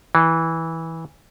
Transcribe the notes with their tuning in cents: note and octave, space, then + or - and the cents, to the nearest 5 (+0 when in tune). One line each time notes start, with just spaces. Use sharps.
E3 -15